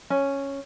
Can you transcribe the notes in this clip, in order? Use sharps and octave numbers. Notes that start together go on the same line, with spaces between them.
C#4